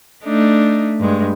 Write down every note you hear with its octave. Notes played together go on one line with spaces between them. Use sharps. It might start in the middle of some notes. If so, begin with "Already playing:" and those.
A3 D4 D#4
G2 G#3